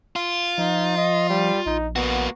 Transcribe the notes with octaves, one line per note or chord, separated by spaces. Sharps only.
F4
F3 D#4
D#5
G3
A#1 D#4
A#3 B3 F#4